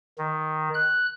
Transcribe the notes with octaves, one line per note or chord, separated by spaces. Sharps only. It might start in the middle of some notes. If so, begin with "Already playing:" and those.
D#3
F#6